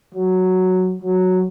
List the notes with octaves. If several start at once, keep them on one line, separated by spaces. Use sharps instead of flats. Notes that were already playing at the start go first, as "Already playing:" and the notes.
F#3
F#3